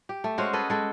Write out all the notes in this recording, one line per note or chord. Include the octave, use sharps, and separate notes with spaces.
G4
A3
G#3 C#4 F#4 C5
G#4 A4 B4 D#5
G#3 A4